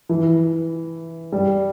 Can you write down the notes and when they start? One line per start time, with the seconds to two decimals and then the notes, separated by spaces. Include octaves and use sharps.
0.09 E3
1.32 G3